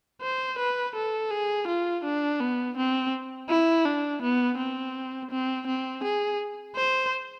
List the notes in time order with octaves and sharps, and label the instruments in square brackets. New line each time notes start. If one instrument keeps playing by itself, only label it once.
[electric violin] C5
B4
A4
G#4
F4
D4
B3
C4
E4
D4
B3
C4
C4
C4
G#4
C5